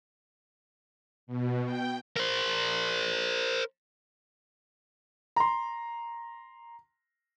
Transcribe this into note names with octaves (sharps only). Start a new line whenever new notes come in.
B2
G5
A#4 C5
A#5 C6